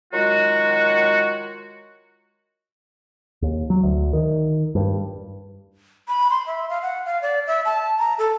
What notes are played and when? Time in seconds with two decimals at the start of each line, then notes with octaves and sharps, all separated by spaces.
0.13 D#3 F#3 G#3 F4 F#4
3.42 D#2
3.70 F#3
3.83 D2
4.13 D#3
4.75 G2
6.08 B5
6.30 C6
6.46 E5
6.69 F5
6.82 F#5
7.06 F5
7.22 D5
7.47 E5
7.65 A5
7.99 A#5
8.18 A4